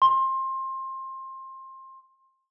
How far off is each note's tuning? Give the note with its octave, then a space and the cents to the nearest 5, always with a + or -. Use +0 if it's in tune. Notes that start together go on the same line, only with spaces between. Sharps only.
C6 +25